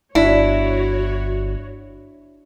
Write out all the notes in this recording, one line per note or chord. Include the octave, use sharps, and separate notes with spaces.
G1 D4 E4 F#4 C#5